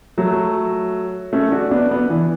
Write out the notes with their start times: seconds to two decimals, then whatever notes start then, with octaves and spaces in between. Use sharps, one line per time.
0.18 F#3 A3
1.33 A3 C#4
1.52 D4 F#4
1.71 B3 D4
1.91 B3 D4
2.10 E3